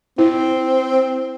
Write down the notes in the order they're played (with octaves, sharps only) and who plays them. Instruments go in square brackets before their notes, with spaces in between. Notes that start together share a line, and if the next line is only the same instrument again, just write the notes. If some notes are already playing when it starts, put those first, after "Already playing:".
[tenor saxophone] C4 [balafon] E4